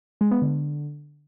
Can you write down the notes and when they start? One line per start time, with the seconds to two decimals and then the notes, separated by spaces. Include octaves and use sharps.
0.21 G#3
0.31 B3
0.42 D3